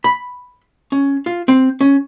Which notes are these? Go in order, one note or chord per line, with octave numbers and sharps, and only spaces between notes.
B5
C#4
F4
C4
C#4